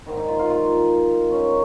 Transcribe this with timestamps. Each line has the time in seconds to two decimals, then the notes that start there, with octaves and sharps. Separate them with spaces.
0.06 G#2 D#3
0.17 D#4
0.28 F4
0.39 F4
0.50 F4
1.30 C#4
1.36 D#4